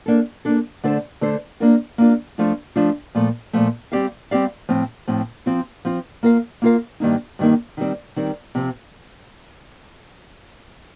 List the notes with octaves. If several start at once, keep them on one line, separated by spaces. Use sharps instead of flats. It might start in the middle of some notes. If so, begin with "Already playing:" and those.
A#3 D4 A4
A#3 D4 A4
D3 A3 D4 A4 C5
D3 A3 D4 A4 C5
A#3 D4 F4 A#4
A#3 D4 F4 A#4
F3 A3 D4 F4
F3 A3 D4 F4
A#2 F3 A3
A#2 F3 A3
G3 C4 G4 D5 F5
G3 C4 G4 D5 F5
A2 F3 C4
A2 F3 C4
F3 C4 F4
F3 C4 F4
A#3 F4 A#4 F5
A#3 F4 A#4 F5
G2 D#3 A#3 D#4
G2 D#3 A#3 D#4
D#3 G3 C4
D#3 G3 C4
C3 F3 C4